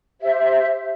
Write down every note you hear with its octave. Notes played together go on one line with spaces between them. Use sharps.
G4 C5 E5